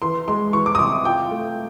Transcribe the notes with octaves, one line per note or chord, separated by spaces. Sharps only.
E3 C6
G#3 C6
E3 C#6
D6
D#6
C3 D6
F4 G5
A3